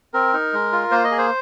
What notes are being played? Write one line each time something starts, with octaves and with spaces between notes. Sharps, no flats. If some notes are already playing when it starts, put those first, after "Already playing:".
C4 A#4
D#4
G#3
F4
A#3 C5
D#5
G#4
C5